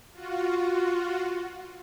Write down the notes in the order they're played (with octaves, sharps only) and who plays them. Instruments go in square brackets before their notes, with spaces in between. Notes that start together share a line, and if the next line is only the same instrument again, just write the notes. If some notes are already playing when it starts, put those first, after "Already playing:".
[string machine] F4 F#4